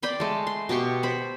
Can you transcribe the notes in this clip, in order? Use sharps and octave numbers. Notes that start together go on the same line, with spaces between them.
D5 G5 B5 C6
G#3 A3
C6
B2 G4 C6 C#6
C5 B5